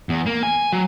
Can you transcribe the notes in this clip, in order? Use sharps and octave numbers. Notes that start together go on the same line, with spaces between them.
E2
A#3
G#5
F#3